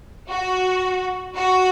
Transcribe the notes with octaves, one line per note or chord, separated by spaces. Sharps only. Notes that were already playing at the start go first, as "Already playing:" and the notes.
F#4
F#4